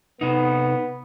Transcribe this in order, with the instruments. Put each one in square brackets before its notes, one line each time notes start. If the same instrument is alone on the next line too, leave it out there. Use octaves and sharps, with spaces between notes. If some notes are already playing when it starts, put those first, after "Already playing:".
[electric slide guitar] C3 D#4 [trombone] B3